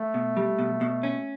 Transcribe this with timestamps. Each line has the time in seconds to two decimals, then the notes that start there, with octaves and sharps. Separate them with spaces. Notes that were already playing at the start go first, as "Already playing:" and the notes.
Already playing: A3
0.14 B2
0.37 G3
0.59 B2
0.81 B2
1.03 C#4